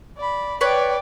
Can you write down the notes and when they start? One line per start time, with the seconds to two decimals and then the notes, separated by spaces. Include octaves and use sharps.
0.17 D5 B5
0.61 B4 C#5 D5 G5